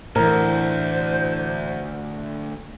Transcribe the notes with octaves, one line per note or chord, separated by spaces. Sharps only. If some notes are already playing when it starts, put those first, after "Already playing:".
D2 A2 E3 A#4 C5